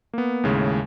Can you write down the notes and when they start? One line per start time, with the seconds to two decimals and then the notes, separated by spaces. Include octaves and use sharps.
0.14 A#3 B3
0.44 D#2 A2 C#3 G#3